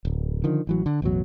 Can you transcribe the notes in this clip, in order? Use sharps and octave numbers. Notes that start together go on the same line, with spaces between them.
D1
D3 D#3 F3
A1 E3 F#3
D3
A1 E2 B2 F#3